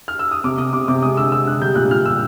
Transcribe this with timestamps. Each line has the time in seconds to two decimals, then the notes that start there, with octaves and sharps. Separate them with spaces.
0.08 F6
0.19 E6
0.31 D#6
0.44 C3 D6
0.58 C3 D#6
0.73 C3 D6
0.88 C3 D6
1.02 G#3 D#6
1.17 D3 E6
1.32 D3 E6
1.46 D3 F#6
1.62 G3 G6
1.76 A#2 F#6
1.91 A#2 F6
2.05 G3 E6